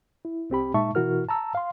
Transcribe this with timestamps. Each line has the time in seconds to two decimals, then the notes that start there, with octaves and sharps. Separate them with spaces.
0.25 E4
0.50 C2 C4 G4 B5
0.74 A#2 G#3 D#4 E5 A5 C#6
0.95 B2 E3 E4 F#4 A#4 F6
1.29 A5 A#5 E6
1.55 F5 C6